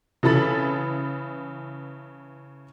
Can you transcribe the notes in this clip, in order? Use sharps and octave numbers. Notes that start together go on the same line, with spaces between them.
C#3 E3 A4 B5 A6